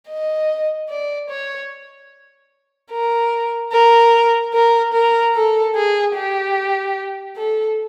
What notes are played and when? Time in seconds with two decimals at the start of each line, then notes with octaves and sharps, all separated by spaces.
0.09 D#5
0.89 D5
1.30 C#5
2.92 A#4
3.72 A#4
4.53 A#4
4.93 A#4
5.34 A4
5.75 G#4
6.15 G4
7.36 A4